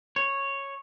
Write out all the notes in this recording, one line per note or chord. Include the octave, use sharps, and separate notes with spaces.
C#5